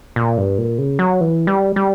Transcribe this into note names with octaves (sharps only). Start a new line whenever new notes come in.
A#2
G2
A#2
C#3
F#3
E3
G3
G3